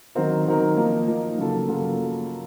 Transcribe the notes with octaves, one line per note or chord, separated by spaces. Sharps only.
D#3 F#3 C4 D#4 A#4
D#3 F#3 C4 D#4 A#4
F3 A#3 D#4
F3 A#3 D#4
C#3 F#3 A#3 F4 A4
C#3 F#3 A#3 F4 A4